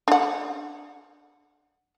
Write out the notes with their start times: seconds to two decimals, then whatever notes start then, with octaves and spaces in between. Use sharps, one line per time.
0.08 D4 F#5